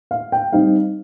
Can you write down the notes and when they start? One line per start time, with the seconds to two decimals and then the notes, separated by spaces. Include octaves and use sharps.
0.11 F5
0.32 G5
0.53 G3 C4 D#4 F5